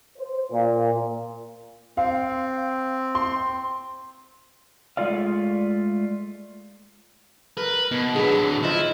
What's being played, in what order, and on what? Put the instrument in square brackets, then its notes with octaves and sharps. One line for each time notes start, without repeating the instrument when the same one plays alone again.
[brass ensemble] C5
A#2
[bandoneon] C4 [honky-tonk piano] F5
[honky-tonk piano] C6
[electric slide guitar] G#3 A3 F4 D5 F5
[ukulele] A#4 [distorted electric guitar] B4
[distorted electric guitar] B2
[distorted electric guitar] D3 F#3 [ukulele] G#4 B4
[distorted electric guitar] E4 [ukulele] F4 C5 D#5